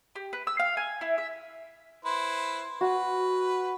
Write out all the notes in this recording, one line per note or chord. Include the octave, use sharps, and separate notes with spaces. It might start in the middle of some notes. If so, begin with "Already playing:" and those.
G4
B4
E6
F5
G#5
E4
E5
E4 B4 C5
F#4 B4